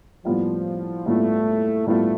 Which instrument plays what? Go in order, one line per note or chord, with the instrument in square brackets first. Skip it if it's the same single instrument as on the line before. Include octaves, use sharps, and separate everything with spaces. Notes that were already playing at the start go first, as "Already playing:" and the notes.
[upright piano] A2 G3 B3 F4 [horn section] F3
[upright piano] A2 G3 B3 F4 [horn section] A3
[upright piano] A2 G3 B3 F4 [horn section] A3